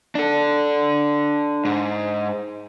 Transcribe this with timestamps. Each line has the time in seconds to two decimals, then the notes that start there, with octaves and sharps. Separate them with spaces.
0.15 D4 A4
1.65 G#2